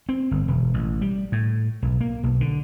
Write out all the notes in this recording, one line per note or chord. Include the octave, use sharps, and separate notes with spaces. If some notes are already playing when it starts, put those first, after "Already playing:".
C4
G1
E1
A1
G3
A2
B1
A#3
B1
D3